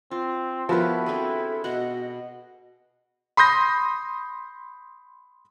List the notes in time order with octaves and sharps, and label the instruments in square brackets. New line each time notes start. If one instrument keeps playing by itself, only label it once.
[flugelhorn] C4 [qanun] F4
[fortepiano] F3 B3 [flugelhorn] E4 [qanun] F#4 G4 [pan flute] A#4
[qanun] C4 D4 G#4 [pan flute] A4
[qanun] B2 F#5 [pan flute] D#5
[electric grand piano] B5 C6 D#6 G6 A#6